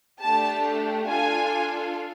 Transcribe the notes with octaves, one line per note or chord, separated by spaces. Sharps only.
A3 D4 G4 A5
D4 F4 A4 G#5